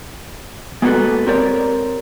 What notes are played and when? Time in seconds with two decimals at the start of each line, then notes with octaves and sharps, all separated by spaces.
0.82 G#3 A#3 B3 D#4 F#4 A4
1.27 C4 G4 A#4 C#5 D5